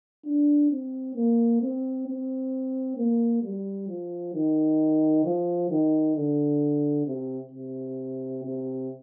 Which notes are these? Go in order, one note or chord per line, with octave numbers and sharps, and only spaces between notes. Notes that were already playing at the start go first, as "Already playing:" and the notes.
D4
C4
A#3
C4
C4
A#3
G3
F3
D#3
F3
D#3
D3
C3
C3
C3